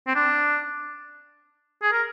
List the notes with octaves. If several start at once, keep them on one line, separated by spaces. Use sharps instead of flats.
C4
D4
G#4
A#4